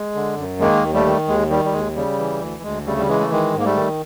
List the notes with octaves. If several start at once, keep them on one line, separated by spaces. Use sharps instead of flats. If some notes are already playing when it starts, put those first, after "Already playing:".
Already playing: G#3
D3
F#2
D#3 G#3 A#3
D#2
G3 A3
D#3
D#2 G#3
D#3 G3
G3
D#2 G#3
C#3 G3
E3
D2
D2 G#3
C#3 G3 A3
G3
E3 G#3
A3
D#3 G#3
G#2
A#3
G3 A3
D#3